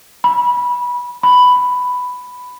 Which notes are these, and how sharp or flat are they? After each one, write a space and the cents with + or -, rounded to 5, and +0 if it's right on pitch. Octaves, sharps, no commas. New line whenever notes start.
B5 -20
B5 +5